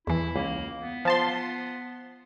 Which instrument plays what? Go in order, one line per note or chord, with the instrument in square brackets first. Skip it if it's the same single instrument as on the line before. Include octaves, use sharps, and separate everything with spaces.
[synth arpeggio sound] E2 E3 [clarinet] E4
[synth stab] C#2 [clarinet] A#3
[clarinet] B3
[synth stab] F3 A5 C6